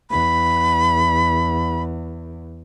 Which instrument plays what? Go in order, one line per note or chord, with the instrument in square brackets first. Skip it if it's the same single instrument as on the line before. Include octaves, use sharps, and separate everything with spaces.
[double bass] E2 [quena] B5